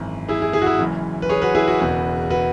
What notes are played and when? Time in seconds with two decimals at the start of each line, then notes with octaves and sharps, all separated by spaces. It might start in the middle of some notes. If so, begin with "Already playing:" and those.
Already playing: G#1 F#2 E3
0.28 E4 G#4
0.42 E4 G#4
0.53 E4 G#4
0.62 F#4
0.66 E4 G#4
0.79 F#1 F#2 E3
1.22 B4
1.29 G#4 C#5
1.42 F#4 B4
1.55 E4 G#4
1.68 F#4
1.80 E1 E2 C#3 F#4 B4
2.30 F#4 B4